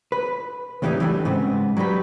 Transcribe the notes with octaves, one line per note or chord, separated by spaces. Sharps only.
B4
D#2 A2 E3 G3 B3 D#4
E3 F#3 G3 A3 D4
G#2 C#3 B3 C4
F#3 G3 D#4 B4